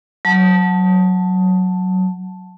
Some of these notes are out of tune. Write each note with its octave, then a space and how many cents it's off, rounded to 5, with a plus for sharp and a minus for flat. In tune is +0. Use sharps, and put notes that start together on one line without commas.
F#3 +0 A5 +0